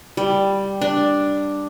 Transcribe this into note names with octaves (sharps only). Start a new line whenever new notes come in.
G3
D4